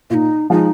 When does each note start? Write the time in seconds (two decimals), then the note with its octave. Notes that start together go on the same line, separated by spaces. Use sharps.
0.10 A#2 D#4 F4
0.50 F3 G#3 D#4